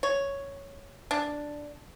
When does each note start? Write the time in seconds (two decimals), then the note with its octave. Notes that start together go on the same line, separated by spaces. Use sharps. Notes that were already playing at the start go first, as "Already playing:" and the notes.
0.03 C#5
1.11 D4